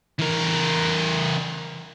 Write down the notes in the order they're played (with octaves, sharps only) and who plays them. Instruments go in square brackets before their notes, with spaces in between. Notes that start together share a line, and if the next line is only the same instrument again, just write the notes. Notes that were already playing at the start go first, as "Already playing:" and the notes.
[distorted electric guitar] E3 A#4